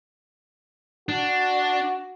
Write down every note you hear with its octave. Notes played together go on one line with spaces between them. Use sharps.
D4 F#4